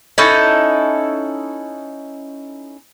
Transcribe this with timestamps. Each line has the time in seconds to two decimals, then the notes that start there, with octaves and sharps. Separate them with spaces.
0.18 C#4 D#4 E4 A4